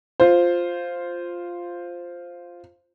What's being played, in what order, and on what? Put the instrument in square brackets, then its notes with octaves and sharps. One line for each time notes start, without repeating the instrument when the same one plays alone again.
[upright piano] F4 C5